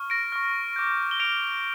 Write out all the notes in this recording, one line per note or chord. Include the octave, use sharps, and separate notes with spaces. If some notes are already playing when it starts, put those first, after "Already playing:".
Already playing: C#6 F6
A#6 D7
C#6 F6
D6 G6
G7
D6 F6 D7 F7